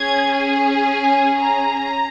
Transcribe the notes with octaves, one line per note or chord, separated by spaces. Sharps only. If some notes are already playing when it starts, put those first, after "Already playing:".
Already playing: C#4 G#4 G#6
G#5
A#5